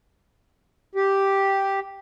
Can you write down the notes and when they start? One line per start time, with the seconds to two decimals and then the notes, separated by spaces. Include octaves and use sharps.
0.95 G4